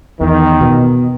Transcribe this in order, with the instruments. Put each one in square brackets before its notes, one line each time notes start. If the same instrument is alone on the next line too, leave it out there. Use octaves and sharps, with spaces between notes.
[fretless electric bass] E2 [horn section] D#3
[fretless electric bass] B2